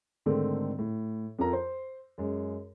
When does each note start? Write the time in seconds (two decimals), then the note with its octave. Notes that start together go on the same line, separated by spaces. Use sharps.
0.26 G#2 D3 D#3 A3 C4
0.79 A2
1.39 F2 F3 A4 A#4 A#5
1.53 C5
2.18 F#2 G#3